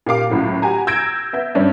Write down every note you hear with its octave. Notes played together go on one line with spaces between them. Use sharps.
A#2 G4 F5 D6
C#2 A2 F#3
F#4 G4 G#5 A#5
E6 G6 G#6 A#6 D7
B3 E5 G6
G2 C#4 D4